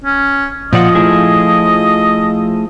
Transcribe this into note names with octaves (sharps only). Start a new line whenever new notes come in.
C#4
A#2 F3 D5 D#5 F#5
A3 E4 G#4